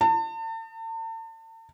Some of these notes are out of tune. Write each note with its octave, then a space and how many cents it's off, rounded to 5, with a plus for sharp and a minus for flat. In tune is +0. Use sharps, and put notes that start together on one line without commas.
A5 +40